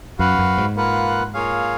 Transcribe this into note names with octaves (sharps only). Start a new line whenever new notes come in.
F#2 F#4 B4 F5
F#2
G#2
A#3 F4 B4 F#5
A#3 F4 G#4 C#5 F5